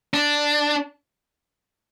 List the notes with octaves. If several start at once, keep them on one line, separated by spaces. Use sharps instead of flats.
D4